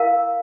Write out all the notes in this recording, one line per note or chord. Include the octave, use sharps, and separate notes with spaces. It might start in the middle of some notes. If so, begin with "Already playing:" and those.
Already playing: E4 A#4 F5